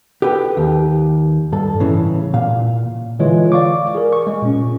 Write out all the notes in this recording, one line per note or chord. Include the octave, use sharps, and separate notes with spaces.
G4 A4 B4 G5
D#2
G2 A4
A2 C#3 E3
A#2 F5
D3 E3 G#3 F4 C#5
D5 F5 C#6 D6
G#4 A#4
C#6
G#3
A#2 C#4